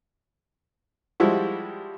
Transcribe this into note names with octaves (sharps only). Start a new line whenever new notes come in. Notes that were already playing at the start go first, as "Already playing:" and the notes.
F3 G3 G#3 E4 F#4